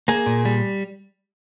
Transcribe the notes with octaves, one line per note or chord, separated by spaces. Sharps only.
A#3 G#4
A#2
G3